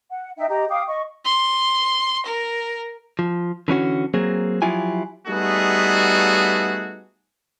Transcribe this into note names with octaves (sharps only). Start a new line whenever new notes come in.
F#5
D#4 E5 G5
G4 D#5 A#5
F5 G5 D6 D#6
D#5 C#6
C6
A#4
F3
D3 E3 C#4 F#4
F#3 A#3 C4 G#4
F3 F#3 E4 F4 G4 G#5
G3 A3 B3 D#4 F#4 G#4